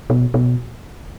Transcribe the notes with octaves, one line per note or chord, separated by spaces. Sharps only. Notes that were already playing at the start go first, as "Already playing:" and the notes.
B2
B2